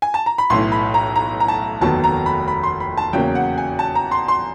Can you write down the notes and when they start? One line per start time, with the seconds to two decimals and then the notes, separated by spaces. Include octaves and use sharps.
0.02 G#5
0.14 A5
0.26 A#5
0.38 B5
0.50 B1 A2 E3 C6
0.72 B5
0.94 A#5
1.16 A#5
1.40 A#5
1.48 A5
1.81 F1 D#2 D#3 F#3 B3 A5
2.04 A#5
2.26 B5
2.48 B5
2.63 C6
2.80 B5
2.97 A5
3.13 E2 C#3 F#3 A#3 G5
3.35 F#5
3.58 G#5
3.79 A5
3.95 A#5
4.11 C6
4.28 C6